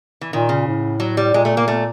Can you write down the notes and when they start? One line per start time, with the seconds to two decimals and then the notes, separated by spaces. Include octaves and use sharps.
0.21 E3
0.32 A#2 D#3
0.49 C#3
0.67 A2
1.00 F#3
1.17 G3
1.34 A#2 G#3
1.45 A3
1.57 A#3
1.68 A3